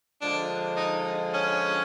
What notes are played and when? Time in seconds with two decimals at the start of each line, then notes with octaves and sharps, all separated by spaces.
0.22 D3 F3 G#3 D4
0.77 D#4
1.33 C#4